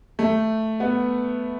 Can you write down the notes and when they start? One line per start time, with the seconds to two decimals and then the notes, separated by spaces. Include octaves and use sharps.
0.19 A3
0.80 B3